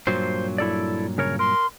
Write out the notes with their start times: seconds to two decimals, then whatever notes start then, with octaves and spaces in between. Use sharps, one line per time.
0.07 G2 A#2 F#3 C5
0.58 E4 A4 D5
1.18 C#3 A#4 C#5
1.39 A#4 C6